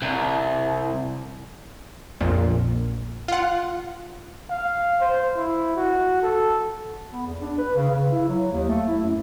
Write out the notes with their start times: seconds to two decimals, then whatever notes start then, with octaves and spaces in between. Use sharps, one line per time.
0.02 C2
2.21 A#1 F2 A#2
3.28 F4 F#5
4.50 F5
5.01 C5
5.36 E4
5.76 F#4
6.22 A4
7.12 B3
7.26 E2
7.42 D4
7.58 B4
7.76 C#3
7.91 C#3
8.12 E4
8.29 F#3
8.52 D#2
8.69 A3
8.88 E4
9.03 F#2